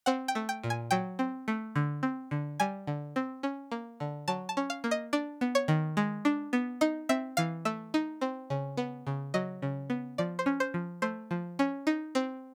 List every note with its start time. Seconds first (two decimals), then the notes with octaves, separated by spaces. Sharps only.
0.06 C4 F#5
0.28 G5
0.35 A3
0.49 G5
0.63 A#2
0.70 G#5
0.91 F#3 G5
1.19 C4
1.48 A3
1.76 D3
2.03 C4
2.31 D3
2.60 G3 G#5
2.87 D3
3.16 C4
3.43 C#4
3.72 A#3
4.00 D3
4.28 F#3 A5
4.49 A5
4.57 C#4
4.70 F5
4.84 A#3
4.91 D#5
5.13 D4 D5
5.41 B3
5.55 C#5
5.68 D#3
5.97 G#3
6.25 D4
6.53 B3
6.81 D#4 D#5
7.09 C4 E5
7.37 E3 F5
7.65 A3 E5
7.94 D#4
8.21 C4
8.50 C#3
8.77 B3
9.07 C#3
9.34 F#3 D#5
9.62 C#3
9.90 B3
10.18 F3 D5
10.39 C5
10.46 C#4
10.60 C5
10.74 F3
11.02 A3 C5
11.31 F3
11.59 C#4
11.87 D#4
12.15 C4